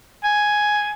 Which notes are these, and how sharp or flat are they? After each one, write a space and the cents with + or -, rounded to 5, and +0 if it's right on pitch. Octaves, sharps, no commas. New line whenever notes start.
G#5 +5